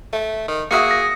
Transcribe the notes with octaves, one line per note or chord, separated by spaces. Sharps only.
A3
D#3
A#3 F#4 G#4 E5 D#6 C#7
A#6